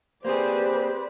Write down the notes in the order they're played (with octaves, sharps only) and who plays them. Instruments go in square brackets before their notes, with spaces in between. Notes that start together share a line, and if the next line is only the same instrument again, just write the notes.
[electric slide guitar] A#3 C4 G#4 [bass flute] G4 [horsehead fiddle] B4 D5 [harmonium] C5